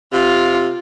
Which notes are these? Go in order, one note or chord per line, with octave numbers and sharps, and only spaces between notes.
C3 F4